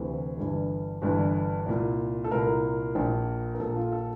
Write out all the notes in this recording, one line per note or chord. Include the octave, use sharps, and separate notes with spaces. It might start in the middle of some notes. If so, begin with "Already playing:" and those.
Already playing: D2 C3 E3
G1 G2 E3
G1 G2 E3
C2 A#2
A4
C2 A#2 A#4
A#1 A#2
A#4
A#1 A#2 A4
F4
A4